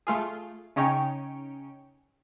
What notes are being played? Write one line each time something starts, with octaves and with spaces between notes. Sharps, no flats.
A3 F4 G#4
C#3 C#4 D#4 C#5 G5